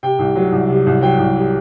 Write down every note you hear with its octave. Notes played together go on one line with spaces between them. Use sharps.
C3 G5
C2
F#3
C2
C3
C2
F#3 G5
C2
C3